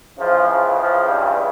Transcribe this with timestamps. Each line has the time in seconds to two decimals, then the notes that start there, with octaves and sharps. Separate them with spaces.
0.18 C#2 C#3 E3 F3
0.47 F3
0.78 F3
1.08 G2 G3